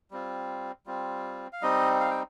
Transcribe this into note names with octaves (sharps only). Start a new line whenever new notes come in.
G3 C4 F4
G3 C4 F4
F5
G3 C4 D#4 D#5
F5
G5